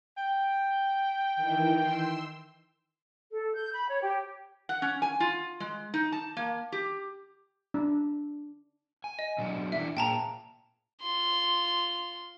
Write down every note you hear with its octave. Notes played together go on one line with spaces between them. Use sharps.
G5
D#3 E3
C6 E6
A4
G6
B5
C#5
G4
F#5
C#4
G#5
F4
G#3
D#4
A5
A#3
G4
D4
G#5
D#5
B2 F#3 D4
E3 D4 E5
A#2 A#3 G#4 G5 A5 A#5
F4 C6